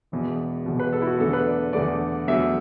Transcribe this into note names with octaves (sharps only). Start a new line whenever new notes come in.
E1 E2 B2
E1 E2 B2
B4
A4
E4
F#4
E2 D3 A3 A4
B4
D5
E2 D3 A3 D5
E2 D3 F#3 A3 E5